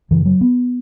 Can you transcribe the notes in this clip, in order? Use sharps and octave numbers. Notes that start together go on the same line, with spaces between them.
F#2 C#3 E3
F#3
B3